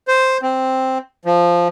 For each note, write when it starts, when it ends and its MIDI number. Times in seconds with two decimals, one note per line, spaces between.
0.08 0.38 72
0.43 0.98 60
1.25 1.68 53